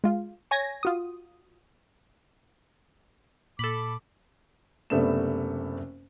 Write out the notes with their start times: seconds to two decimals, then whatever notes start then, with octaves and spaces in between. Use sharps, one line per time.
0.04 G#3 F4
0.51 C#5 G#5 G#6 A#6
0.83 F4 F#4 D#6
3.59 A#2 A4 B5 D6
4.90 F#1 C3 A3 B3 D4 E7